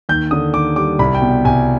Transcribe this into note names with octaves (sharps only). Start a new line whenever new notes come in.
D#2 G6
D3 D#6
D#2 D6
G3 D6
C2 B5
G5
B2
G5
C2 G#5